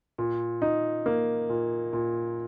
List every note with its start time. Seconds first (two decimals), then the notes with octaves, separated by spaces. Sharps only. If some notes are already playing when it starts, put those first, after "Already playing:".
0.18 A#2
0.62 D#4
1.06 A#3
1.49 A#2
1.93 A#2